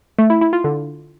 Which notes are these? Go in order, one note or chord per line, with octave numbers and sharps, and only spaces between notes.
A3
E4
E4
F4
D3